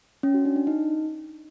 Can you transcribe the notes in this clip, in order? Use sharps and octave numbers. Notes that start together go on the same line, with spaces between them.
C#4
F#4
D4
D4
D#4